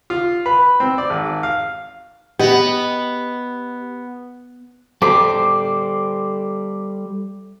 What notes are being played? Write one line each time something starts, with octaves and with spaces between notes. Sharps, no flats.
F4
B4
C4
D5
G#1
F5
B3 G4 D#5
G3 A4 C5 D6